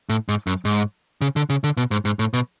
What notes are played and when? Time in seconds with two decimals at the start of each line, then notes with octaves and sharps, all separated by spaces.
0.09 A2
0.29 G#2
0.47 F#2
0.65 G#2
1.21 C#3
1.36 D3
1.50 C#3
1.64 D3
1.77 B2
1.91 G#2
2.05 G#2
2.19 A2
2.33 B2